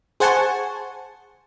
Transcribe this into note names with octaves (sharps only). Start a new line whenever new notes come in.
G#4 C5 F#5 G#5 A5 C#6